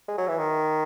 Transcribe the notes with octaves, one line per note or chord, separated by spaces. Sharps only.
G#3
F#3
E3
D#3